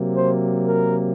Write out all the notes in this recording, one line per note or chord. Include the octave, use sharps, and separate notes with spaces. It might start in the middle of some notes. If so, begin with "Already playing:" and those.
Already playing: C3 F#3 A#3
C5
A#4